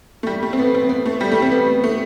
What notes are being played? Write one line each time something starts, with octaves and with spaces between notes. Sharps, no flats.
A3
G3
A3
C4
B3
C4
B3
A3
G3
A3
C4
B3
A3